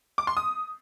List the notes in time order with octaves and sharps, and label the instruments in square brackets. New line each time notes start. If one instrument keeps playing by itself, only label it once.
[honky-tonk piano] D6
C6
D#6